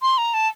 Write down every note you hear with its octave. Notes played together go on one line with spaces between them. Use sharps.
C6
A#5
A5